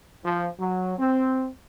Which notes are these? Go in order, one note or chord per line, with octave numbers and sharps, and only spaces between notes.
F3
F#3
C4